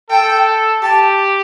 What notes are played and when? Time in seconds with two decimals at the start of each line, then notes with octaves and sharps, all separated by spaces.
0.10 A4 G5
0.82 G4 A5